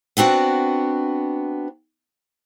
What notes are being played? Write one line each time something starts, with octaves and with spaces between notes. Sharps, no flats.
B3 C4 D4 F#4